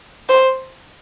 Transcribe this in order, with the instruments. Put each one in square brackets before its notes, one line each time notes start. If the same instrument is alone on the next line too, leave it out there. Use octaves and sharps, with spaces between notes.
[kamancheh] C5